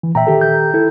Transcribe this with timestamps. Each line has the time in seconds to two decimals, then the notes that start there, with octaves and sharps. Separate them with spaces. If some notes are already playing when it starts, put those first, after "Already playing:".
0.03 E3
0.15 A#2 E5 G5 A#5
0.27 D#3 G4 A4
0.41 G6
0.74 E4 A4